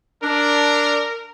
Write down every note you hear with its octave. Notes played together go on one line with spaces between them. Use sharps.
D4 A#4